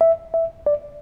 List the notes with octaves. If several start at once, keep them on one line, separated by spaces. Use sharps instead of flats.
E5
E5
D5